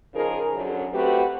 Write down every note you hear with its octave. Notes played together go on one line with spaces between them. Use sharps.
C#3 F3 D#4 G#4 A#4
F#2 D3
A3 C4 F#4 G4 B4